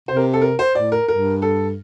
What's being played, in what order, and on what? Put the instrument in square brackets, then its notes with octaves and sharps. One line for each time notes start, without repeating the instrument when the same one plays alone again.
[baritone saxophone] C3 [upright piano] C5
[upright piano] A#4
A4
A#4
C5
[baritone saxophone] A2 [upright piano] D5
[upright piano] A#4
[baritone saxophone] G2 [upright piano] A#4
[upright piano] A4